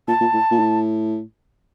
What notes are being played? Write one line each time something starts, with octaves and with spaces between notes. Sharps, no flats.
A#2 A5
A#2
A2
A#2
A2